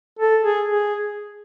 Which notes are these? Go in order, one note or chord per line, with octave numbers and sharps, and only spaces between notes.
A4
G#4
G#4